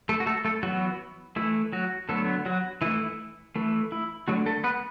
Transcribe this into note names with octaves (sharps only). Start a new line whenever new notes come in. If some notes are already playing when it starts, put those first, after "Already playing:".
A3 A4
F#4
A3 A4
A3 A4
E3 F#3 B3 F#4
E3 A3 E4
F#3 F#4
D3 F#3 A3 B3 A4
F#3 F#4
E3 A3 E4
E4
E3 A3
E4
D3 F#3 A3 F#4
A3 A4
B3 B4